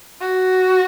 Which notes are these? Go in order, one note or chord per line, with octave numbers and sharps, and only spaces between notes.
F#4